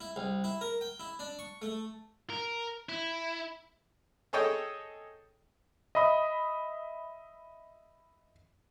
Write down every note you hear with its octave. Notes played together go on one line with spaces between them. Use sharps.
E4
C2
E4
A#4
G5
E4
D4
C#6
A3
A#4
E4
G#4 A4 C#5 D#5 G5
D#5 E5 B5 D#6